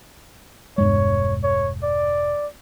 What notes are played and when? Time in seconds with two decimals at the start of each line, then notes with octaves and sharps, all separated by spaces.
0.78 E1 G2 G#3 C#5
1.43 C#5
1.83 D5